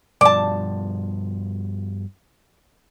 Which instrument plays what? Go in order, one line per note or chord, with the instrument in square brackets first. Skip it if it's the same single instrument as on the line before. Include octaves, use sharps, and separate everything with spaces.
[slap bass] G2 B2 F3 [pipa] D5 A5